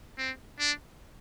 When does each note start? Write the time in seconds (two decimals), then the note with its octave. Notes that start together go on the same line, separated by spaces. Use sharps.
0.18 C4
0.59 D4